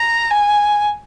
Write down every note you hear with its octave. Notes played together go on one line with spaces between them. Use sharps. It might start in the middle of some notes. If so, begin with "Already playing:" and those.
Already playing: A#5
G#5